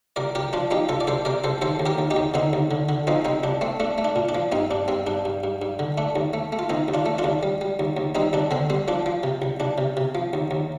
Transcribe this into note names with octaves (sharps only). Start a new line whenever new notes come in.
C2 A#4 D5
C2 G4 A#4
F3 D4 F4
F3 D#4 G4
C2 F4 A4
D5
C2 A4 C5
C3 A#4 D5
C2 A4 C5
D#2 A4 C5
D#2
G4 A#4
D#2
D#4 G4
D#2
D3 C4 D#4
D#2
D3
D3
F3 C4 D#4
C2 C4 D#4
C2 D4
A3 C4
A3 D4
A3
D4
A#2
D4
F3
G2 C4 D#4
G2 D4
G2 C4
G2 D4
G2
G2
G2
D3
A3 D4
D#2
A3
A3
F4
D#3 C4 D#4
D#2
D4 F4
A3
D4 F4
D#2
G3
G3
D#2
D#2
G3 C4 D#4
D#2 D4
D3 C4
G3 C4
F3 D4
F3
C3
C2
C2 D4
C3
C3
F3
D#2
D#2